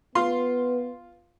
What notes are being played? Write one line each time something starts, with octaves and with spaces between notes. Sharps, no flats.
B3 F4 C6